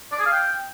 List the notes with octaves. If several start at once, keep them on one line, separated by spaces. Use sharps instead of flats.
D5
G#4
F5
G5